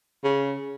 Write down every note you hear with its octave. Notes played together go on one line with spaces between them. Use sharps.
C#3